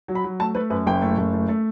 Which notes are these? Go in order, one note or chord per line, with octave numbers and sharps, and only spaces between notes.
F#3
B5
F#3
A3 A5
A3 B4
F#2 B4
F#1 G5
A3
F#1
A3
A3